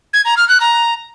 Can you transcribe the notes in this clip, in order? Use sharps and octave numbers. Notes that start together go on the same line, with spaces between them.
G#6
A#5
F6
F#6
A#5